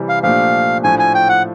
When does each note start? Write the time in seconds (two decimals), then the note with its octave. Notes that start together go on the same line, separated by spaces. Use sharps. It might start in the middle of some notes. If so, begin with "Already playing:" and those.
Already playing: C3 E3 G3
0.09 F5
0.23 A#2 F3 A3 D4 G4 F5
0.84 A2 F3 A3 D4 G#5
0.99 G#5
1.14 G5
1.29 F#5